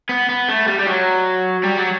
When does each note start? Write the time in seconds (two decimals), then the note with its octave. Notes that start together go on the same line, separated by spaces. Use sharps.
0.09 B3
0.29 B3
0.48 A3
0.67 G3
0.79 G3
0.87 F#3
1.64 G3
1.78 F#3